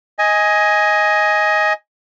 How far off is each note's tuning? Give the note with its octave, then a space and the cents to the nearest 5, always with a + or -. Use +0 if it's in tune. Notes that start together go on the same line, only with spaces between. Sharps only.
D#5 +15 G#5 +0